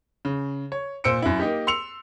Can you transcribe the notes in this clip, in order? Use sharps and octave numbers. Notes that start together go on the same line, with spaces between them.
C#3
C#5
A#2 C5 E6 C#7 D7
F#2 E4
A#3 D#4 G4
C6 E6 C#7 F7